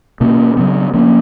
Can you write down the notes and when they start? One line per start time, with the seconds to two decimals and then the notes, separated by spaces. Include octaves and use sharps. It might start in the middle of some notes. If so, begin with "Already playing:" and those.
0.21 B2 A#3 C#4
0.57 C#3 F#3 B3
0.94 F3 A#3 C#4